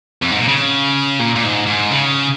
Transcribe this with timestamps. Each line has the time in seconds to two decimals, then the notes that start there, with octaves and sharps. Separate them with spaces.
0.22 F2
0.31 G#2
0.39 A#2
0.48 C#3
1.19 A#2
1.36 A#2
1.44 G#2
1.67 G#2
1.91 C#3